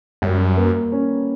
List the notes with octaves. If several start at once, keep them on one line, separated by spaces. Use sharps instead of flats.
F#2 G3
A#3
C#4